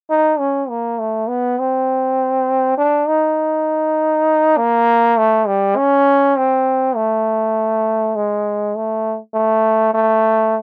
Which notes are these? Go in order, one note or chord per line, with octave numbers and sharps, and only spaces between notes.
D#4
C#4
A#3
A3
B3
C4
D4
D#4
A#3
A3
G3
C#4
C4
A3
G#3
A3
A3
A3